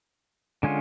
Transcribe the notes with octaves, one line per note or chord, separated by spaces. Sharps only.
D3 G#3 C#4 F4